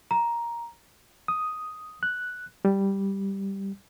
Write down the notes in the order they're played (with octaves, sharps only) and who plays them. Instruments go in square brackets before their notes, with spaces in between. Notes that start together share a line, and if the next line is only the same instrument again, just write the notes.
[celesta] A#5
[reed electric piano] D#6
F#6
G3